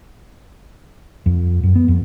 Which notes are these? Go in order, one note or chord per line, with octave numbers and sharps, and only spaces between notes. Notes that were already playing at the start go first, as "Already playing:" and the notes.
F2
F#2
B3
F2